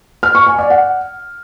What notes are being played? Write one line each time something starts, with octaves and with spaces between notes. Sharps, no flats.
F6
C#6
G#5
D5
F#5